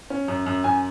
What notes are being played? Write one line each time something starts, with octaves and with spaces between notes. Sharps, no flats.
C#4
F#2
F#2
F#2 G#5